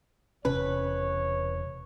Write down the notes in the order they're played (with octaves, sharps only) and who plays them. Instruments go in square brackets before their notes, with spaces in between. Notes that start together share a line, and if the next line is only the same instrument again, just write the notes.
[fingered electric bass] E1 C3 C#4 [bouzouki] B4 [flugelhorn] C#5